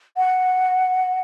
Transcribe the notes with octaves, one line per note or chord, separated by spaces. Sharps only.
F#5